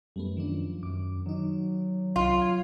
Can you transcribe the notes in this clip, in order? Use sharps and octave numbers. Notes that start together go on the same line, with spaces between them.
F#2 G3 A3 B3
D#3 F3 D4
F#2 D6
D#3 F#3 D#4
C2 F4
G#6